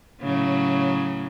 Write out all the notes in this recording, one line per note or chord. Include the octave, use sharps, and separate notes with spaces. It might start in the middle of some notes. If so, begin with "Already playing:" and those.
A2 C#3 F#3